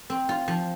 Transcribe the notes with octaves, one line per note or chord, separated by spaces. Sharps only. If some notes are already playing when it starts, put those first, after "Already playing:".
C4
F4
F3